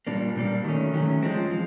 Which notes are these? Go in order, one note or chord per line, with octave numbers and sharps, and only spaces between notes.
A#2 G3 A#3 D4
A#2 G3 A#3 D4
D#3 F#3 A3 C#4
D#3 F#3 A3 C#4
F3 G#3 C4
F3